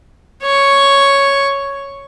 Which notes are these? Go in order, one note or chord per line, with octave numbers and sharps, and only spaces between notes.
C#5 C#6